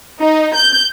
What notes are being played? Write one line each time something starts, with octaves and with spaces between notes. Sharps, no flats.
D#4
G6